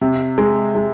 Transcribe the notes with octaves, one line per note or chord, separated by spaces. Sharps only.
C3
G#3
G#3